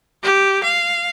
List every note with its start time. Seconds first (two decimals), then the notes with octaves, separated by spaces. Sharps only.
0.23 G4
0.64 F5